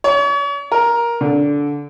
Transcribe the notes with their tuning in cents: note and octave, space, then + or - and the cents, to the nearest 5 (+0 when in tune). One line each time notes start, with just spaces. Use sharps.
C#5 +40
A#4 +10
D3 -15